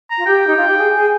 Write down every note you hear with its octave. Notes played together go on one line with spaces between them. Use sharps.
A#5
F4
G4 G5
D#4
F4
G4
G#4
G#4